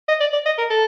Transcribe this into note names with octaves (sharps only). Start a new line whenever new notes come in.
D#5
D5
D5
D#5
A#4
A4